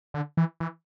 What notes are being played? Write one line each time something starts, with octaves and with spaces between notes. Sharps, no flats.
D3
E3
E3